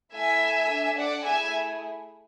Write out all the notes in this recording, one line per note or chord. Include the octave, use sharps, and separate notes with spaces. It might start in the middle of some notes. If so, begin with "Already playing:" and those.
A3 E4 A4 E5 G#5
D4 A4
D5 F#5
A3 E4 G#4 E5 G#5